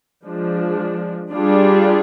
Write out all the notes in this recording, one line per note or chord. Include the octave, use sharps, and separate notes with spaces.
F3 G#3 D4
G3 D4 F4 G#4